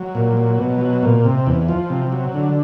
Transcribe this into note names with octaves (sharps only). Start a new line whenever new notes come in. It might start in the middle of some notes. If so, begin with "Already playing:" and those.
Already playing: F#3
A#2
F#3
B2
F#3
A#2
C3
E2
F3
C3
F#3
D3